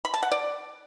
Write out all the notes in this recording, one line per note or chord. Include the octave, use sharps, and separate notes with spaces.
B5
A5
F#5
D5